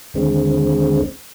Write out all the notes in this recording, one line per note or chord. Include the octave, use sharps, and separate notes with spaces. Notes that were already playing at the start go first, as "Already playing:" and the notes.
D#2 D3 G#3 C4